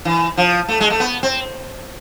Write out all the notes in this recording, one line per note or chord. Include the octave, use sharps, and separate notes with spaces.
E3
F3
A3
G#3
A3
B3
C4